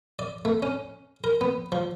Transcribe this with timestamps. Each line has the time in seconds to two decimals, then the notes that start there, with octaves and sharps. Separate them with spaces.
0.19 D5
0.45 A3
0.63 C#4
1.24 A#4
1.41 B3
1.72 F3